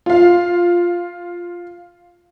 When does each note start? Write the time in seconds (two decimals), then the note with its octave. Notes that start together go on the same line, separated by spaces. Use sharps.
0.06 F4 F5